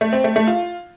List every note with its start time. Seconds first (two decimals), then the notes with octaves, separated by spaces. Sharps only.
0.01 A3
0.13 C4
0.24 A3
0.36 A3
0.47 F4